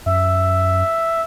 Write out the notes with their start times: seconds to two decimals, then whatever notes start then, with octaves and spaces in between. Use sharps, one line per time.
0.06 F#2 E5